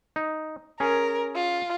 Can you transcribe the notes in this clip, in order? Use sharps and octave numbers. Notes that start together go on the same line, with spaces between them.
D#4
C#4 G#4 A#4
F4